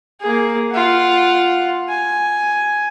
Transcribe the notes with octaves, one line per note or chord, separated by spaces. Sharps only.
A#3 G#4
F4 F#5
G#5